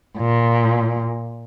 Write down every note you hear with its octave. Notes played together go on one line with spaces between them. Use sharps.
A#2